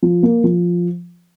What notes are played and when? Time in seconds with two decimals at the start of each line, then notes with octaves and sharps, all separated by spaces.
0.02 F3
0.23 A#3
0.44 F3